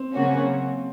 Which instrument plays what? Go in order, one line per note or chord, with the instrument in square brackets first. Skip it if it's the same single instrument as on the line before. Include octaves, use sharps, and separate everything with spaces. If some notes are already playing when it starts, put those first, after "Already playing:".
Already playing: [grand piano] C4
[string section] C#3 F#3 A#3 C#4 F#4